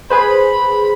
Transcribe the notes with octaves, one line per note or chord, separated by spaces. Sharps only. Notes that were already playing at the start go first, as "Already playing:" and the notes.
G#4 B4 C5 B5